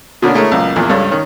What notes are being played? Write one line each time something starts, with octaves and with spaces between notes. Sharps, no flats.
B2 D3 A#3 C#4 D4
G#3 A3 E4 A#4 C#5
C#2 F#2 A#2
A#1 E2 A#2
C#2 G2 D4 A4 C#5
D#3 C#4